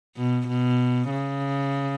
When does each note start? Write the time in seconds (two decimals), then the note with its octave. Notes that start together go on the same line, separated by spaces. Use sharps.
0.17 B2
0.47 B2
1.10 C#3